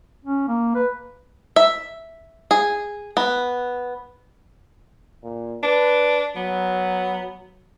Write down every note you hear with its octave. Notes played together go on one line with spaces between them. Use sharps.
C#4
A#3
B4
E5
G#4
B3
A#2
D4 B4
F#3 B3